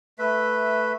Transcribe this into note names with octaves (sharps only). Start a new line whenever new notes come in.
A3 B4 E5